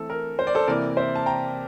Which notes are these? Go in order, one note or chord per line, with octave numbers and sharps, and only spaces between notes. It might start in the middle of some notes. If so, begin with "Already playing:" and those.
Already playing: E3 A3 C4 A4
A#4
C5
D5
A4 C5
C3 E3 A#3 A#4 D5
C5 E5
A5
G5 A#5